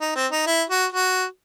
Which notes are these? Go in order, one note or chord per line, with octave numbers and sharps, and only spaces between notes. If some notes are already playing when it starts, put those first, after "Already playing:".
D#4
C4
D#4
E4
F#4
F#4